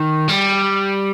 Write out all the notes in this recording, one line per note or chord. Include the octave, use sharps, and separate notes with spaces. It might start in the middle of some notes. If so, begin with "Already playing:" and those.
Already playing: D#3
G3